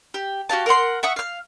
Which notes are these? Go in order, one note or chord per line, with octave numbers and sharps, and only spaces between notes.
G4
F#4 G4 F5 A5
A#4 E5 F#5 C6
E5 F#5 C#6 D#6
F5 F6